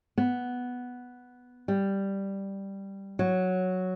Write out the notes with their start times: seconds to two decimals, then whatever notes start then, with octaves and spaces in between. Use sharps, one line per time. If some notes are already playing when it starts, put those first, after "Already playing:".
0.18 B3
1.68 G3
3.19 F#3